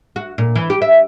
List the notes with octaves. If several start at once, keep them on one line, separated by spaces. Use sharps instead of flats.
F#4
A#2
E3
G4
E5